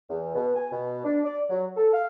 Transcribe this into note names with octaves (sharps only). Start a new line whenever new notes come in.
E2
B2
G#5
B2
D4
D5
F#3
A4
F5